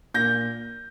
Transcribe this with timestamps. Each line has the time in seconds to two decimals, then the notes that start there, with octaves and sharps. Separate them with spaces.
0.14 A#2 G6 A#6